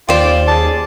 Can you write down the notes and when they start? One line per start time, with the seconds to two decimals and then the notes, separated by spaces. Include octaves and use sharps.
0.09 D#2 F4 C5 D5 G5
0.48 C#4 G#4 D5 A5